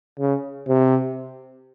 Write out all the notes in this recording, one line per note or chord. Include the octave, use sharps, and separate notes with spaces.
C#3
C3